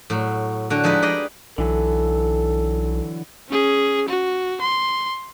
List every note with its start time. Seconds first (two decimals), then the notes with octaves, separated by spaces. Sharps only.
0.10 A2 F#3
0.70 D3 F#4 A4 G5
0.84 F3 G#3 D#4 E4 B4
1.02 G4 G#4 D5 D#5
1.58 B1 D3 E3 F#3 A4
3.49 C#4 G#4
4.08 F#4
4.61 C6